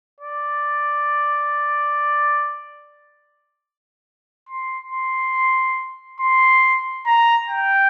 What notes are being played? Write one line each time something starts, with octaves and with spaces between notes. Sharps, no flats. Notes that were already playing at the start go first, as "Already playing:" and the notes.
D5
C6
C6
C6
A#5
G5